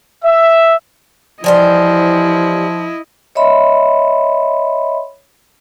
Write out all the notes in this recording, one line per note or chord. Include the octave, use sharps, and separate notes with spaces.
E5
E3 F3 G3 E4 C5 D#5
C#5 D#5 E5 B5 C6